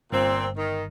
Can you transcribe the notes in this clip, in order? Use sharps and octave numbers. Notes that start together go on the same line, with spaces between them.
G1 A#2 C4
D#3